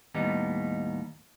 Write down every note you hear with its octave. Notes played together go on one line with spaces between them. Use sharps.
D#2 A2 G3 B3 D#4